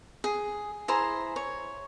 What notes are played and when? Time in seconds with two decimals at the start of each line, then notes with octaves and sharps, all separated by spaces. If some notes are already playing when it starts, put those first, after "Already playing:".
0.24 G#4
0.88 E4 G#4 C5 A#5
1.36 C#5